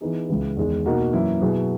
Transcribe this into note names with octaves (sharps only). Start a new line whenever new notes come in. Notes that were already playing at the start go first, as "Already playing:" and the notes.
E3 B3 D#4 G#4
C#2 C#3 E3
E2 D#3 G#3
B2 A#3 D#4 F#4 A#4
F#2 E3 A#3 E4
B2 F#3 B3 E4 G#4